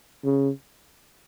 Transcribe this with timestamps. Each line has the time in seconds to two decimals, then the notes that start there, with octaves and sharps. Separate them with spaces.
0.24 C#3